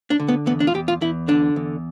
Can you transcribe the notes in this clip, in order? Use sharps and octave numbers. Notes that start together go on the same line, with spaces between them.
D4
D3
B3
E2 B3
D4
F4
E2 G4
F4
E2 E4
D3 D4
E2